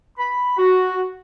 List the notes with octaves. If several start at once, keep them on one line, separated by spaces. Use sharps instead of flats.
B5
F#4